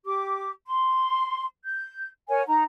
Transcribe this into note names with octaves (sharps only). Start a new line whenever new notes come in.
G4 D6
C6
G6
A#4 C#5 F#5 G#5
D#4 A#5